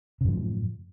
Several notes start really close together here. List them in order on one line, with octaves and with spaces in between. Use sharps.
C#3 F#2 F3 A2